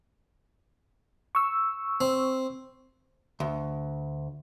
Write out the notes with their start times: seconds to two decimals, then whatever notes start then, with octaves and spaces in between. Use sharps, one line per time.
1.35 C#6 E6
2.01 C4
3.40 D2